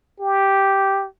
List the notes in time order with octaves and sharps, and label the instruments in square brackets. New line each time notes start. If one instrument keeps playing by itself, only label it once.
[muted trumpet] G4